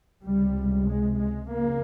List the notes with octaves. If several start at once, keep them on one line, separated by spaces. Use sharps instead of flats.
C#2 C3 G3
G#3
G#3
F2 C#3 A#3